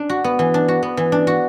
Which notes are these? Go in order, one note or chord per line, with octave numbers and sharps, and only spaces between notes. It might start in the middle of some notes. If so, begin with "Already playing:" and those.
Already playing: D4
F#4
B3
E3
D4
F#4
B3
E3
D4
F#4